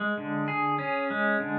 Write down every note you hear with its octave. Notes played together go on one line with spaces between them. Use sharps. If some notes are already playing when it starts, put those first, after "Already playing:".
Already playing: G#3
D3
G#4
C#4
G#3
D3